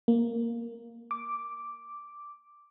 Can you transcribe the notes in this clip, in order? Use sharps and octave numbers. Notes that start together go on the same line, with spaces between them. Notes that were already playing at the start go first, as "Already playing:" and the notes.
A#3
D6